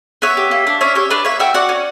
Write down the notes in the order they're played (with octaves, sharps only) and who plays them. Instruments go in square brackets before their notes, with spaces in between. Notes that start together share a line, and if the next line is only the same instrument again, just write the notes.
[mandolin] B3 C#5 E5
G4
A#3
D4
C#4 C#5 E5
G4 C#5 E5
D4 B4 D5
A#3 C#5 E5
F#4 E5 G5
F#4 D5 F#5
C#4